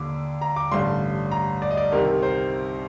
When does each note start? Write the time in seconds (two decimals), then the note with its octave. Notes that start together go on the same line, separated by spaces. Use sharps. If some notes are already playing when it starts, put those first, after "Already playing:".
Already playing: D#2 D3 D6
0.41 A#5
0.56 D6
0.72 A1 G2 D3 C6
1.31 A#5
1.62 D5
1.71 D#5
1.77 D5
1.92 C2 C3 D#3 A#4
2.22 C5